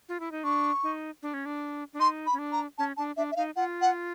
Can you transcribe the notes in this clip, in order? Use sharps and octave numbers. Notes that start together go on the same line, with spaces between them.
F4
E4
D#4
D4 C#6
D#4
D4
C#4
D4
D4
D#4 C6
B5
C#4
D4
A#5
C#4 A5
D4 A5
D4 E5
E5
D#4 F5
F4 F#5
F#5